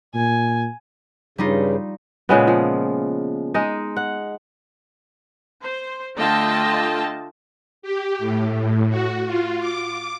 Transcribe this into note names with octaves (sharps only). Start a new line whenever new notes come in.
A#2 G#5
G2 C#3 G3 D#4 F4
A#2 C#3 G#3 B3
F3
G#3 D#4
F#5
C5
D3 A3 F4 D#5 G5 A5
G4
A2
F#4
F4
D6